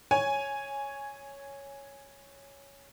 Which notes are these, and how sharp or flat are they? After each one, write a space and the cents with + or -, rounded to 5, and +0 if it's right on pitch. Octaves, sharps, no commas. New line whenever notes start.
C#5 +0 G#5 +0